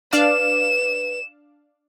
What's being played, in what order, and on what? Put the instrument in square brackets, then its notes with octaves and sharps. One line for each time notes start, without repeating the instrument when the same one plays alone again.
[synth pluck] D4 D5 F5 [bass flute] B4 [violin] E7